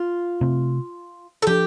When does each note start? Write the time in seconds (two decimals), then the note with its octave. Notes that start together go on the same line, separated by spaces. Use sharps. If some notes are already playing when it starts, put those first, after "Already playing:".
Already playing: F4
0.41 C3 A3 C4
1.42 A4
1.47 F3 D4 G4